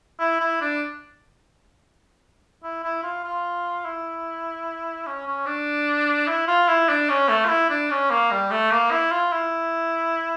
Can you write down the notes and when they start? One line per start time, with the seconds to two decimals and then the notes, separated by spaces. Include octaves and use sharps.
0.19 E4
0.40 E4
0.61 D4
2.63 E4
2.83 E4
3.03 F4
3.24 F4
3.85 E4
5.07 C#4
5.27 C#4
5.46 D4
6.27 E4
6.47 F4
6.68 E4
6.89 D4
7.09 C#4
7.29 A3
7.45 F4
7.49 E4
7.70 D4
7.90 C#4
8.10 A#3
8.31 G3
8.51 A3
8.71 A#3
8.91 E4
9.11 F4
9.32 E4